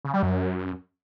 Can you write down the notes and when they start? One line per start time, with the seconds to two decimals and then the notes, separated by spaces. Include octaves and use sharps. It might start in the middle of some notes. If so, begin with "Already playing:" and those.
0.05 C#3
0.14 G3
0.23 F#2